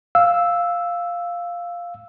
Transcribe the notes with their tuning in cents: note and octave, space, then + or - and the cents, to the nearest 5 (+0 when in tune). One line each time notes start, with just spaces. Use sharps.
F5 +0 E6 +0